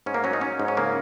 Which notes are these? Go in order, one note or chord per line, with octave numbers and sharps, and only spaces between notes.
G#2 C#4
A#3
F#3 C#4
D#4
F#3 C#4
G#2
C#4
C#3 A#3